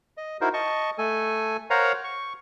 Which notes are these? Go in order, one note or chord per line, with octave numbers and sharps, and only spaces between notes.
D#5
D#4 E4 F#4 A#4 C5
D#5 A5 C#6
A3 A4 G#5
A#4 C5 C#5 F5 F#5 A#5
C#6